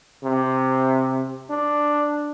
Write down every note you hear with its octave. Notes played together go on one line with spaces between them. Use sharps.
C3
D4